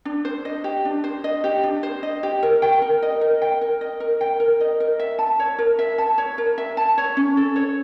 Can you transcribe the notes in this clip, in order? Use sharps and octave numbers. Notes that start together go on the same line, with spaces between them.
D4
C5
D#5
G4
D4
C5
D#5
G4
D4
C5
D#5
G4
A#4
G5
A#4
D#5
A#4
G5
A#4
D#5
A#4
G5
A#4
D#5
A#4
E5
A5
C#5
A#4
E5
A5
C#5
A#4
E5
A5
C#5
C#4
A4
C#5